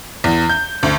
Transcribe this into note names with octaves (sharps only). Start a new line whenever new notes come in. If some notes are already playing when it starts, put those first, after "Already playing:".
E2
G6
D2